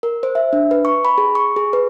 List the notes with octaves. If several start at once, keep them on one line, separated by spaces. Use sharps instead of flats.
A#4
C5
E5
D4
B4
C#6
B5
G#4
C#6
G#4
B4